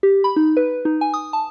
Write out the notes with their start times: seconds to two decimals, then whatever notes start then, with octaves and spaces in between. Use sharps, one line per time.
0.03 G4
0.24 B5
0.36 D#4
0.57 B4
0.85 D#4
1.01 G#5
1.14 D#6
1.33 A5